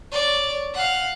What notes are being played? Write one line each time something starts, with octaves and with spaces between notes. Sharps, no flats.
C#5 D5
F5 F#5